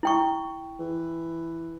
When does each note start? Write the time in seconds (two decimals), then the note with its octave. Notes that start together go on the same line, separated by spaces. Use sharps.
0.03 E4 G5 C#6
0.79 E3